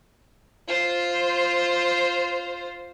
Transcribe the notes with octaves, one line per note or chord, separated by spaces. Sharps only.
F4 C5